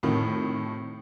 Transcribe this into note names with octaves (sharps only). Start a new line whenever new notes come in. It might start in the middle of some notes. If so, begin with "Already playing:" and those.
F2 A2 C3 D#3